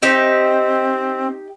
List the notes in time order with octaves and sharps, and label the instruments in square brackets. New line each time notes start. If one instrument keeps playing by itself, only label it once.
[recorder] C4 [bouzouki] D#4 G4 E5